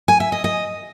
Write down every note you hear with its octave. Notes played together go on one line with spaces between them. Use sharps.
G#5
E5
D#5
D#5